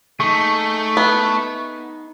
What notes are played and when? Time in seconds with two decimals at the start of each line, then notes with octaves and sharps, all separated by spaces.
0.20 A3 D#4 G#4 C#6
0.97 B3